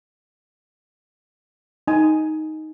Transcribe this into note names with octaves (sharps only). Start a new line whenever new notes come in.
D#4 G#5